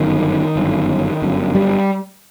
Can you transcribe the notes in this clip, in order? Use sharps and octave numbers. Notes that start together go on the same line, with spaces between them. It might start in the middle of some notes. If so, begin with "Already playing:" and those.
Already playing: G1 F#2 D#3
G1 F#2
G1 F#2
G3